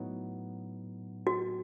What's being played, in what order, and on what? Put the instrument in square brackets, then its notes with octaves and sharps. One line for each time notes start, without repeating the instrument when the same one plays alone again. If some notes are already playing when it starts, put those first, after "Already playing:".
Already playing: [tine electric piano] A2 F#3 B3 D#4
[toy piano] F#4